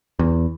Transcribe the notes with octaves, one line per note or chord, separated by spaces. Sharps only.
E2